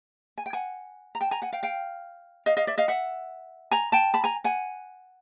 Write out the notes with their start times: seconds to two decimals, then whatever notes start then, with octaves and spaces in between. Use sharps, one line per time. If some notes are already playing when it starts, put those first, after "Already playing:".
0.38 G#5
0.46 G5
0.53 F#5 G#5
1.15 A#5
1.21 G5 A5
1.31 G#5 A#5
1.42 F#5 G#5
1.52 F5 G5
1.63 F5 G5
2.46 D#5 F5
2.57 D#5 F5
2.67 D5 E5
2.78 D#5 F5
2.88 E5 F#5
3.71 G#5 A#5
3.92 G5 A5
4.14 A5 B5
4.24 G#5 A#5
4.44 F#5 G#5